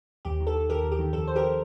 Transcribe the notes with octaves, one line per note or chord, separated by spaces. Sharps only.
D#2 G4
D#3
A4
D#3
D#2 G4 A#4
D#2
G4
D#3
F2 A4
F2 C5
G4 A#4